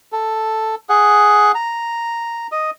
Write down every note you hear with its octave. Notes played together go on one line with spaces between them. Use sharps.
A4
G#4 F#5
A#5
D#5